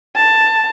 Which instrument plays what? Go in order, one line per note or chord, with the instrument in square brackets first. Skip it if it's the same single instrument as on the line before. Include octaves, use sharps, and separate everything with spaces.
[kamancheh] A5